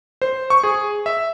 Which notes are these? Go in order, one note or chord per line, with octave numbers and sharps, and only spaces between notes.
C5
C#6
G#4
E5